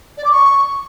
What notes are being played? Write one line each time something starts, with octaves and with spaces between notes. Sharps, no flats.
D5
D6
C#6